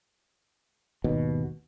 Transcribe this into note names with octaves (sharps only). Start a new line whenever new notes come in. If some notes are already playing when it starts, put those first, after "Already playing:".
G#1 D#2 B2